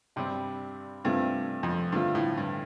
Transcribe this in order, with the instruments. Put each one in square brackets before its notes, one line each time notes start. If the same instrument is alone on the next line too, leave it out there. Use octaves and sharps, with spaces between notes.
[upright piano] G2 G3 D4 [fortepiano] C3
[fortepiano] G2 [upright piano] C3 A3 C4 F4
[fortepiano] F2
[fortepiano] G2 [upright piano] D3 F3 A3 F4
[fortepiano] A2
G2